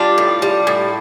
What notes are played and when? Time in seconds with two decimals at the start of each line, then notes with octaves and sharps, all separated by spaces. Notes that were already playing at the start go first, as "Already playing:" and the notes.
Already playing: G3 D4 F4
0.18 A2
0.42 G3
0.67 A2